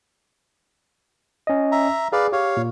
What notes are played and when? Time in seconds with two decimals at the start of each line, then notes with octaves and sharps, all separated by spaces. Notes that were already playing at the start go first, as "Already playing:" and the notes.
1.47 C#4 D#5
1.72 E5 A#5
2.12 G#4 B4 D5 F5
2.33 G4 C#5 F5
2.57 A#2